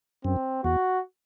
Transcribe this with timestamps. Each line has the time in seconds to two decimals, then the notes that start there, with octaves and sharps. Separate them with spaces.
0.25 F#2 C4
0.64 E2 F#4